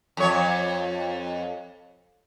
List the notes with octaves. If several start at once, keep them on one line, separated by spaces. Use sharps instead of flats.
F2 C#5